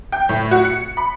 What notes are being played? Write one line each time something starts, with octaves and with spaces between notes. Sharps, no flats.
G5
A2
F#4
C#7
B5